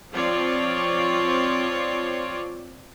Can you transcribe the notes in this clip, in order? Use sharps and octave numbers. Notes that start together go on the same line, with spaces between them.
F3 C4 F4 C#5 D5